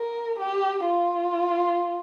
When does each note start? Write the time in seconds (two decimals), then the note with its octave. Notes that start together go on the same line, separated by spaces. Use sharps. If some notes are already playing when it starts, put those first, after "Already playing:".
Already playing: A#4
0.39 G4
0.85 F4